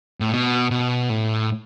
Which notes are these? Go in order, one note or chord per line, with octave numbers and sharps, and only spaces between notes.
A2
B2
B2
A2